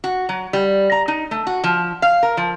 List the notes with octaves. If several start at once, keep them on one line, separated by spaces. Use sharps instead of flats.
F#4
F#3
G3
A#5
D#4
A3
F#4
F3
F5
A#4
F3